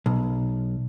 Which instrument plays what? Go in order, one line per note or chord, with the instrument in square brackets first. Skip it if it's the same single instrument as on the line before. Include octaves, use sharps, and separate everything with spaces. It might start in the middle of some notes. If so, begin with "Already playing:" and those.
[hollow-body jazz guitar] B1